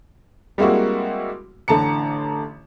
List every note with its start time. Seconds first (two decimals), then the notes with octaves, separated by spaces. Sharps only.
0.58 G3 G#3 A#3 C4 E4 F#4
1.68 A1 D3 A5 A#5 C#7